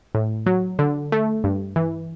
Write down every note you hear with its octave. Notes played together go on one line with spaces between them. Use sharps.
A2
F#3
D3
A3
G2
E3